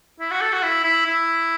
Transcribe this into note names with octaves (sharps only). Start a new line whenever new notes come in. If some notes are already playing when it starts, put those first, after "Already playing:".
E4
F#4
A4
F#4
E4
E4
E4